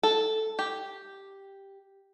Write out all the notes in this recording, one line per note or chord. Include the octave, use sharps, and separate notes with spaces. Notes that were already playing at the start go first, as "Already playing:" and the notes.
A4
G4